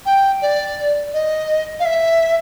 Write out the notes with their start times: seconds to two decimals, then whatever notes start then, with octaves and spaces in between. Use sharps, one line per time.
0.05 G5
0.41 D5
1.13 D#5
1.79 F5
1.85 E5